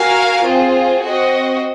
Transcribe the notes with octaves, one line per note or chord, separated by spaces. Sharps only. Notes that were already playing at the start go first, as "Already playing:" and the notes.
Already playing: F#4 A#4 F5 G#5
C4 F4 G#4 C5
C4 F#4 C5 D#5 F#5